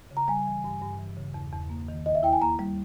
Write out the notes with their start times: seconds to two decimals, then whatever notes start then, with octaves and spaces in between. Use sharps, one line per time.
0.11 C#3
0.17 A#5
0.28 G3 G#5
0.47 E3
0.64 G2
0.82 G2
1.00 E3
1.17 C#3
1.34 E2
1.52 E2
1.70 A#3
1.88 D#3
2.06 D#2 D#5
2.15 E5
2.23 E4 G5
2.33 G#5
2.41 A#3 A#5
2.59 G3